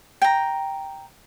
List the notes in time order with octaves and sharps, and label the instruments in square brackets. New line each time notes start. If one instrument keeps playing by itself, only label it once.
[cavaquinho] G5 A#5